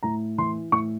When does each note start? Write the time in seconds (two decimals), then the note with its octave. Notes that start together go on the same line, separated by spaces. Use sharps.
0.03 A2 A#5
0.38 E3 C6
0.72 A2 C#6